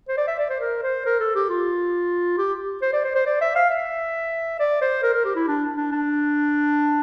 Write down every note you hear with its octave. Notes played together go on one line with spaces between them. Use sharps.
C5
D5
E5
D5
C5
A#4
C5
A#4
A4
G4
F4
G4
C5
D5
C5
C5
D5
E5
F5
E5
D5
C5
A#4
A#4
G4
E4
D4
D4
D4